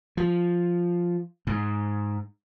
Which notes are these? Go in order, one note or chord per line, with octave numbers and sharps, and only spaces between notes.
F3
G#2